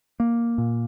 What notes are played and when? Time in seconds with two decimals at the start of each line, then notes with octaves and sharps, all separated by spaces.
0.20 A#3
0.58 A#2